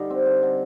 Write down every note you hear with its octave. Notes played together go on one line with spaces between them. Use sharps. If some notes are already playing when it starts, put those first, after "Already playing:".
Already playing: D3 G3 D#4
C4
D3
D3